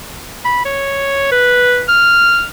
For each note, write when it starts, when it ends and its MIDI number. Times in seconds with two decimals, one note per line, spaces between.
0.45 0.65 83
0.65 1.27 73
1.31 1.83 71
1.88 2.45 89